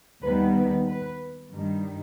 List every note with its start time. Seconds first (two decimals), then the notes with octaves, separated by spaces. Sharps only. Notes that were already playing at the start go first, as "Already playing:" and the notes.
0.22 D#2 D#3 G3 B3 B4
0.55 B4
0.87 B4
1.51 G2 D#3 G3